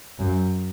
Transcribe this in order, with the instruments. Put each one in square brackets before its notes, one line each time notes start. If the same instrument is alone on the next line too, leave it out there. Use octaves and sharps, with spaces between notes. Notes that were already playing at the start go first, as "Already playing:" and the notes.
[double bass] F#2